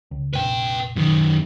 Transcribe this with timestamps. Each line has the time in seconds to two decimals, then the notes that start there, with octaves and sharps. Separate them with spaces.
0.11 C#2
0.33 F1 A#1 B4 G5
0.96 F#2 D#3